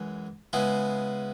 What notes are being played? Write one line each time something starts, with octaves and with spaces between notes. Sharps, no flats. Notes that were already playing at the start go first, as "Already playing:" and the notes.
Already playing: F#2 E3 G#3
C#3 G#3 B3 E4